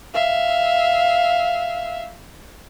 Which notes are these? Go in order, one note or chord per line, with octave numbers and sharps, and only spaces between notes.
E5 F5